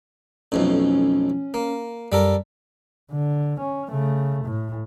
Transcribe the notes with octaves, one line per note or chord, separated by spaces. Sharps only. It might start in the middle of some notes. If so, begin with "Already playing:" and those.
B1 F2 A2 C#4
A#3
F#2 G3 A4 A#4
D3
C#4
C#3 A3
A2